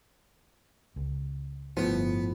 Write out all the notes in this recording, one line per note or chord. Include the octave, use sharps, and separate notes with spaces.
C#2
G1 A2 F3 B3